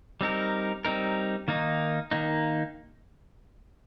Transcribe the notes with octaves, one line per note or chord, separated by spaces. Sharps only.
G3 C4 D#4 A#4
G3 C4 D#4 A#4
D#3 A#3 D#4
D#3 A#3 D#4